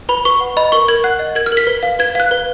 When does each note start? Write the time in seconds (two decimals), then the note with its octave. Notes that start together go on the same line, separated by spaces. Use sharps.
0.09 B4 B5
0.25 B4 C#6
0.41 F#5
0.57 D#5 B5
0.72 A#4 C#6
0.88 A#4 G#6
1.04 F#5 F#6
1.19 D#5
1.35 A#4 G#6
1.46 F6
1.52 A#4
1.57 B6
1.67 B4
1.83 F5
1.99 B4 G#6
2.15 F5 F#6
2.31 B4